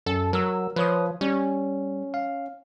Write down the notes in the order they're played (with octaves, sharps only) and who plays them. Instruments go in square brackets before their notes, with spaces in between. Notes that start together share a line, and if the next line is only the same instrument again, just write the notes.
[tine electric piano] F#2 [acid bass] A4
[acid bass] F#3 [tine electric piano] A#4 E6
[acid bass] F3 [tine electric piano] B4 C#5 D#6
[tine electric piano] G3 [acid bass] C#4
[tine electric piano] F5